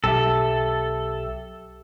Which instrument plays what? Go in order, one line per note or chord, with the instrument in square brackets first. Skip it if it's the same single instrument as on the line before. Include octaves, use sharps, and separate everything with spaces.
[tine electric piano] B1 G4 E5 [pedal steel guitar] A4